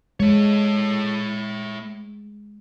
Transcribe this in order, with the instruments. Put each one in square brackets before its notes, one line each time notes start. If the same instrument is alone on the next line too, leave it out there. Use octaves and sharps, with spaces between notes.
[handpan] G#3 [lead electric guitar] A3 C#5